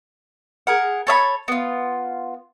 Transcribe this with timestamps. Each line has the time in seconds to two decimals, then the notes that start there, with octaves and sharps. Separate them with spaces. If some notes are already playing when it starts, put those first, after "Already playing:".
0.67 G#4 A#4 F#5
1.07 A4 C#5 E5 B5
1.48 B3 F4